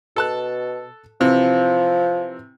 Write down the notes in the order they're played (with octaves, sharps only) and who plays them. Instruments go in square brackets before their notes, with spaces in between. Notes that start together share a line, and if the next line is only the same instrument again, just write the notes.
[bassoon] B2 [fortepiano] A4 A5 F#6
[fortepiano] C3 E3 [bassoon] F3